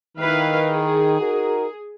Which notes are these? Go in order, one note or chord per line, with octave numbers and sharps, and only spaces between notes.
D#3 E4 B4 F5
G#4
D#4 F#4 A#4